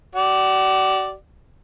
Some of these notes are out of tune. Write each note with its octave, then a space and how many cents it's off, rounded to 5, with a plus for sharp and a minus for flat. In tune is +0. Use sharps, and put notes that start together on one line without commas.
F#4 +45 D5 +0